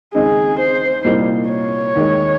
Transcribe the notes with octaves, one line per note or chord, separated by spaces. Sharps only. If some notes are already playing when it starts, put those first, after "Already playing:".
D#2 C#3 G#3 C4 D#4 G#4
C5
C2 A#2 G3 A#3 D#4
C#5
D#2 D#3 G#3